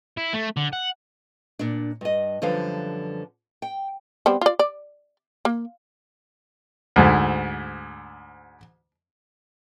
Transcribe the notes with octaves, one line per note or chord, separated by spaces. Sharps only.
E4
A3
D3
F#5
A#2 D4
G2 D#5
F#2 D3 F3 G3 B4 F5
G5
G3 B3 C4
F4 D5
D5
A#3
D2 G#2